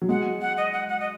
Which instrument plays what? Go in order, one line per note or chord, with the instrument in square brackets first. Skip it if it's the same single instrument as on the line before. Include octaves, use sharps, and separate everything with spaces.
[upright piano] F#3
[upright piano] G#3 [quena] F#5
[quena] F#5
D#5
F#5
F#5
D#5